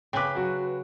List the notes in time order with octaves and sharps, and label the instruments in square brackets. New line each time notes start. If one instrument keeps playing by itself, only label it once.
[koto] C#3 B4 [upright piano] G5 D6
[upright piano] F#3 F#4